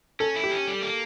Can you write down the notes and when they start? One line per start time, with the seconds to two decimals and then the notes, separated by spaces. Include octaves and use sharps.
0.20 C#4 A4
0.36 E4
0.44 G4
0.51 C#4
0.67 G3
0.82 A#3